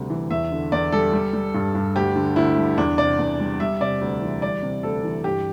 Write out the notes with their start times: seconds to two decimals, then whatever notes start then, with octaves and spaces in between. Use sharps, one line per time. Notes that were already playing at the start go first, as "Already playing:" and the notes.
Already playing: D2 C3 G3
0.10 E3
0.30 E2 E5
0.51 D3
0.72 E2 D5
0.92 G3 A4
1.13 G3
1.33 G3
1.54 G2
1.75 G2
1.95 D2 G4
2.16 D3
2.36 D2 E4
2.56 G3
2.78 E2 D4
2.98 C3 D5
3.19 E2
3.40 G3
3.60 G3 E5
3.80 C3 D5
4.01 D2
4.22 E3
4.42 G3 D5
4.63 C3
4.83 D2 A4
5.04 E3
5.24 G2 G4